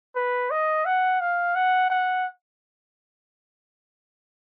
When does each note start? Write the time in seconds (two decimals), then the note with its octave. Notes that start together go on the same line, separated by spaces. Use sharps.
0.16 B4
0.51 D#5
0.85 F#5
1.21 F5
1.55 F#5
1.90 F#5